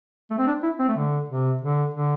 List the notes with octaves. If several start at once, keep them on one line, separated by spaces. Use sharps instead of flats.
A3
C4
D4
E4
C4
A3
D3
C3
D3
D3